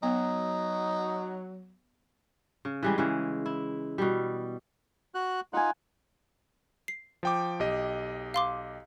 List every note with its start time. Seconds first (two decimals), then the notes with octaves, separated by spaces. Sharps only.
0.03 F#3 B3 D#4
2.65 C#3
2.83 E3 G3 G#3
2.98 C#3 E3
3.46 E4
3.98 B2 G3
5.15 F#4 F#6
5.53 D#4 F4 F#5 G#5
6.88 C7
7.23 F3 G5 D6
7.60 B1 G4 D#5
8.34 F5 C6 D6